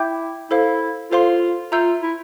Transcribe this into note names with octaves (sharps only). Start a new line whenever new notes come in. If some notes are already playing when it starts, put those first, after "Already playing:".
Already playing: E4 E5 G5 D6 G6
E4 A4 C5 F5
F4 A4 C5 F5 C6
F4 E5 A#5 E6 G6
E4